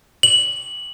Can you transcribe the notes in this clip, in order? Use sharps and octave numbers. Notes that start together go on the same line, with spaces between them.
F#7